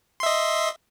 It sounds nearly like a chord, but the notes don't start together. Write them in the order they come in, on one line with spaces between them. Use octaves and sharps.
C6 E5 D#5